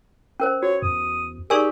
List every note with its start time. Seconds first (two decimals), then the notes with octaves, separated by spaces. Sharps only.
0.40 C#4 A#4 C5
0.62 F#4 C#5
0.82 E2 D#6
1.50 D#4 G4 G#4 A#4 D5 G#5 C#6